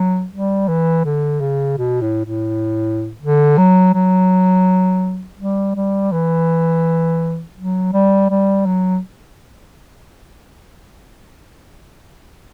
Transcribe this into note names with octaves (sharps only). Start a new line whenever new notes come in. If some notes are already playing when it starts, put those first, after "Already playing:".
Already playing: F#3
G3
E3
D3
C#3
B2
A2
A2
D3
F#3
F#3
G3
G3
E3
F#3
G3
G3
F#3